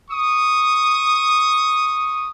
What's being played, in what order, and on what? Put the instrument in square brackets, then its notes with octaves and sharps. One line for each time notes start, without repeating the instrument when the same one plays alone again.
[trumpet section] C#6 D#6